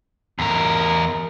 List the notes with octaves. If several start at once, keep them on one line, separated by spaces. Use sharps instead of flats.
E2 A#4